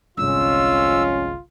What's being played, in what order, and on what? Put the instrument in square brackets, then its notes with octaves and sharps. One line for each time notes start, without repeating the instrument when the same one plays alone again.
[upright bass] G1 C2 [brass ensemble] F2 G#3 C#4 [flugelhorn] F4 [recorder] E6